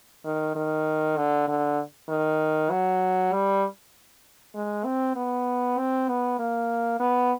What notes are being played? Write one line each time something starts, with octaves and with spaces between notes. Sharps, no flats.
D#3
D#3
D3
D3
D#3
F#3
G3
G#3
C4
B3
C4
B3
A#3
B3